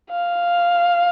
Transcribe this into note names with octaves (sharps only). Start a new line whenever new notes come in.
F5